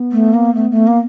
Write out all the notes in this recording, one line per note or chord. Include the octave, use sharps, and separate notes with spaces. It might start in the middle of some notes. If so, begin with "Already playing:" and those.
Already playing: B3
A3
A#3
A3
A3
A#3